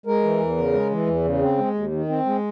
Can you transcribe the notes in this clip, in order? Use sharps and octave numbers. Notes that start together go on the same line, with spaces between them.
G#3 A#4
E3
E2
C#3
G#3
E3
E2
C#3
C4
G#3
D#2
D#3
C4
G#3